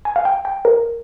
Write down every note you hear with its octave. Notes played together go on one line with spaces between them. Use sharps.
G#5
F5
G5
G5
A#4